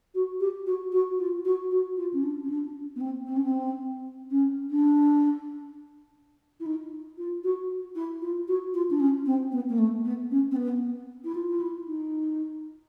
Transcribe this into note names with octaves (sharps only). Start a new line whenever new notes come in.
F#4
G4
F#4
F#4
F4
F#4
F#4
F4
C#4
D4
C#4
D4
B3
C4
C4
C#4
C4
C#4
D4
E4
D#4
F4
F#4
E4
F4
F#4
F4
D4
C#4
C4
B3
A#3
A3
B3
C#4
C4
B3
E4
F4
F4
E4
D#4